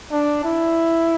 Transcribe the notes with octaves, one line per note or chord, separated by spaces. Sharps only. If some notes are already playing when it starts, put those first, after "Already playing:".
D4
E4